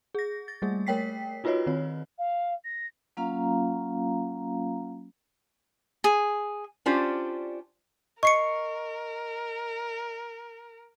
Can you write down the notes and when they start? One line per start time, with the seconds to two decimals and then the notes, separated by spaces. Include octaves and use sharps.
0.15 G#4 A#6
0.48 A6
0.62 G3 A3 A#3 G#4
0.87 A3 A#4 C#5 G5 B6 C7
1.44 D#4 F4 F#4 B4 C#5 D#5
1.67 D#3 C4 C#5
2.18 F5
2.64 A#6
3.17 F#3 A#3 C#4 F4 F5 A#5
6.04 G#4
6.86 C#4 D4 F4 G4 C5 D5
8.23 A#4 D#5 C#6 C7 C#7